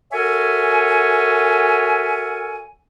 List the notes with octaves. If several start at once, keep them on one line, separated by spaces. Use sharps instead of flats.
F#4 A4 A#4 C#5 E5 G#5